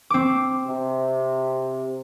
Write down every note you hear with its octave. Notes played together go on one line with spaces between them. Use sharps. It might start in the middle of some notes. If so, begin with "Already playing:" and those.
C4 D6
C3